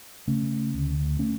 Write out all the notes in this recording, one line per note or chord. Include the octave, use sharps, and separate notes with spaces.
C#3 A3 C#4
D2
A3 C#4